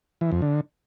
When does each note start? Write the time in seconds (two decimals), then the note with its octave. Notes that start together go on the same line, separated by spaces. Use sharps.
0.21 E3
0.32 F2
0.42 D3